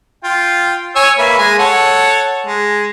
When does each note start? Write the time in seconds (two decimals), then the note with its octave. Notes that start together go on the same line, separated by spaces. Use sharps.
0.24 F4 G5
0.96 C#5 G#5 E6
1.18 A#3 B4 E5
1.39 G#3 G#5
1.59 A4 C#5 F#5
2.47 G#3